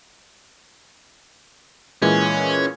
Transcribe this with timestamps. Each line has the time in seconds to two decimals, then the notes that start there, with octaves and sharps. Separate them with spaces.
2.02 A#2 E3 G#3 C#4